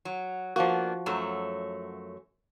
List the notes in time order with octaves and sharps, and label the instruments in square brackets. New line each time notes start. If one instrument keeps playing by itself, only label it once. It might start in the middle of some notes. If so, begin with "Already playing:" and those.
[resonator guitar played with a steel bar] F#3
[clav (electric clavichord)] F3 F#4 [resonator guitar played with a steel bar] A#3 B3 D4
[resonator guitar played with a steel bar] F#2 F#3 A3